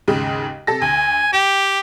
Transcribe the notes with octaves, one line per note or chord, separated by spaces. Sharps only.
D#2 G#2 C#3
C3 A4 A#6
D2 G#5
G4 G5